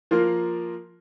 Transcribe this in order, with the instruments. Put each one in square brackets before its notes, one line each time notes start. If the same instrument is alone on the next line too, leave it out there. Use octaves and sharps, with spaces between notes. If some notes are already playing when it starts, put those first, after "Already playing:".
[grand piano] F3 A#3 F4 A#4